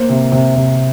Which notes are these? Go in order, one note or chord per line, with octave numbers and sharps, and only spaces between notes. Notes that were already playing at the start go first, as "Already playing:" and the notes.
Already playing: A#3 C5
C3
C3
C3